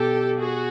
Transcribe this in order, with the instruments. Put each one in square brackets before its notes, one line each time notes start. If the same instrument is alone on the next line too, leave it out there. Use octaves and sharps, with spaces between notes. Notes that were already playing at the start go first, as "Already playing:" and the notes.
Already playing: [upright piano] B2 [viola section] G4 A4
[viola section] F#4 G#4